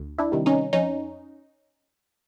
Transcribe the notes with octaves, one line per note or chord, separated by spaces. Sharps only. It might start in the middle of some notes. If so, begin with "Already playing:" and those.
Already playing: D2
D4 E4
C3 D#3 G3
C#4 D#4
F2 C#4 D#4